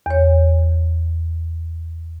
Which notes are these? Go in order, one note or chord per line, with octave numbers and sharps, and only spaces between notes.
E2 C#5